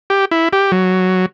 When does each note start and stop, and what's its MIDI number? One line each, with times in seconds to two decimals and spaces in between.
0.10 0.25 67
0.31 0.49 64
0.53 0.72 67
0.72 1.26 54